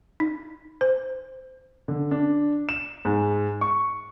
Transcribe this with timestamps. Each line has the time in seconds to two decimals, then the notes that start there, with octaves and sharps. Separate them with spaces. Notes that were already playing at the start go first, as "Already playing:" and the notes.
0.20 D#4
0.81 C5
1.88 D3
2.11 D4
2.69 E7
3.05 G#2
3.61 C#6